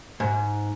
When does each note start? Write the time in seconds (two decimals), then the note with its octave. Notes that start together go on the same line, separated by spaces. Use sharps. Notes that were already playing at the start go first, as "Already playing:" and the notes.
0.20 G#2